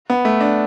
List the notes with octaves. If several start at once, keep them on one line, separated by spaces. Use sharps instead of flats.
B3
A3
D4